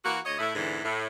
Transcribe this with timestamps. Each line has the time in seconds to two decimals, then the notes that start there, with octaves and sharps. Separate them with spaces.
0.04 E3 A#3 F#4
0.25 D2 C#5 D#5
0.39 A2 E4
0.54 E2 G#2 D3 E3
0.84 A2